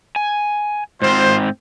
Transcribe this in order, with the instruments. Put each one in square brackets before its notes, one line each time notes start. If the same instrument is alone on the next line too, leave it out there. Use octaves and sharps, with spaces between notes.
[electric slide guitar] G#5
[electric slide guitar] G#2 C4 [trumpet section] F4 C5